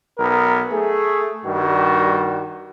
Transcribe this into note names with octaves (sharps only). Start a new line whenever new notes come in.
B1 B3 A#4
A3 G#4
G2 D#3 G3 F#4